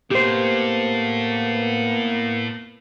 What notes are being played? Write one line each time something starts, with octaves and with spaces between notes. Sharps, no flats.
A2 A#3 B3 G4 C5